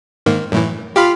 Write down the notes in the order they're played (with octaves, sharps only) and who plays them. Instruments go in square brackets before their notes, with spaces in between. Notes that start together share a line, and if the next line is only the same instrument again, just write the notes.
[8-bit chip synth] G#2 D#3 A#3
F#2 A2 E3
[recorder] F4 [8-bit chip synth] G4 F5 B5